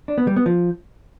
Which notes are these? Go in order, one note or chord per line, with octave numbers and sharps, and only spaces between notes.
D4
B3
G3
B3
F3